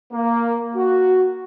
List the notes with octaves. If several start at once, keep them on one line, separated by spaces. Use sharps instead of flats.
A#3
F#4